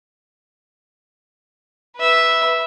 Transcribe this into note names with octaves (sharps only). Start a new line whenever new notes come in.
B4 E5